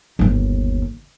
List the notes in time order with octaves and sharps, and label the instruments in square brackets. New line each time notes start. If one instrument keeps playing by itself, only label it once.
[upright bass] G1 D#2